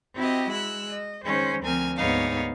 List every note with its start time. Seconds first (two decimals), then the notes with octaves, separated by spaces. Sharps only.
0.15 C4 E4 F#4 G4 D#5
0.51 G#3 E6 F#6
0.91 D#5
1.24 D#3 G#3 C#4 C5
1.62 D2 F3 C4 A#4 G#5 F6
1.97 D2 G#2 B3 D#4 C#5 F5